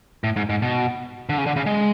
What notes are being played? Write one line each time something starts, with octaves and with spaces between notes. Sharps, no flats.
A2
G#2
G#2
B2
D3
C#3
D3
C#3
G#3